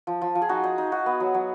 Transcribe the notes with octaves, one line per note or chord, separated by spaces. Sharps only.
F3
F3
F3
G#4
D#4 F#4
D#4
D#4
D#4 F#4
B3
F#3
F#3